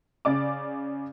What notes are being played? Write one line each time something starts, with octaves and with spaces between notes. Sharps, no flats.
C#3 D5 D6